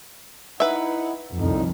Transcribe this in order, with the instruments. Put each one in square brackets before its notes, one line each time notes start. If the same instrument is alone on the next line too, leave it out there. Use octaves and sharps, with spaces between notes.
[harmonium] D#4 E4 F#5 [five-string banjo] B4 E5
[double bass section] C2 F2 [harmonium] A2 D3 D#4